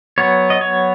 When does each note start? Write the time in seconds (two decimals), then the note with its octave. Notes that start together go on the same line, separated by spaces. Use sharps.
0.18 F#3 B3 C#5
0.50 D#5
0.61 C#5